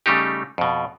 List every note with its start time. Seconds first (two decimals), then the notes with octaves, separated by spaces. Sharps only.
0.06 C#3 G3 A3 D#4 G4
0.58 F2 B2